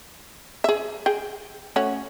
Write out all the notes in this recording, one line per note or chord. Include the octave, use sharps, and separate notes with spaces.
G#4 E5
G#4 G5
A3 C#4 F#4